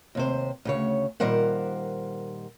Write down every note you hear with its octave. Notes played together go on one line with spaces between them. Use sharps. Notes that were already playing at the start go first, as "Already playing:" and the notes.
D#2 C3 C5
D2 C#3 C#5
A#2 D#3 G3 A#4 C5 F#5